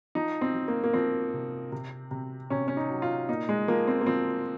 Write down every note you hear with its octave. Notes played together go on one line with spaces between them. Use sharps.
F3 D#4
C4
F3
A#3
A#3
F3 C4
C3
C3
C3
C3 C#4
C#4
D#4
F#3
F4
A#2 D#4
G#3
F3 A#3
C4
A#3
F3 C4